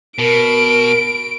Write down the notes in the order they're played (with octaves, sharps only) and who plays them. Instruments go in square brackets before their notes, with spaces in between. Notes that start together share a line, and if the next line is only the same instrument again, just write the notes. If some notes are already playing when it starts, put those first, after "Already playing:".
[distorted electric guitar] B2 [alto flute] A#4 [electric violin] D7